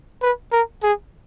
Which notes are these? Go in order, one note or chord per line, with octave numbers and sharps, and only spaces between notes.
B4
A#4
G#4